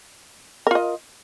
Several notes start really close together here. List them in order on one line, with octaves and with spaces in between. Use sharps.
A#4 F4 D#5